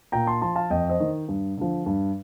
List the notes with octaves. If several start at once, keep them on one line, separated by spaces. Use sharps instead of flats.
A#2 G5 A#5
A5 C6
F3 A5 C6
F5 A5
F2 D#5 G5
C5 D#5
D#3
G2
D3 F3
G2